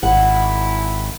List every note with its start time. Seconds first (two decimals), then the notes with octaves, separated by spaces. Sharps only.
0.03 G#1 E4 F#5